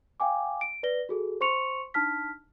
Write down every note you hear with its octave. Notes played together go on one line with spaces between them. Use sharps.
F5 G5 G#5 D6
D7
B4 D5 A#6 G7
F#4 G#4 A4
C5 C6 C#6 C#7 F7
D4 D#4 A5 F6 B6